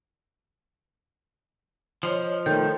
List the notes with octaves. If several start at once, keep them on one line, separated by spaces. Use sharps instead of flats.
F3 C#5 D#5
D#3 A3 A4 G5 G6